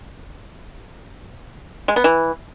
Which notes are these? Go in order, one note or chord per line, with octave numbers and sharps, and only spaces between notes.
G#3
B3
E3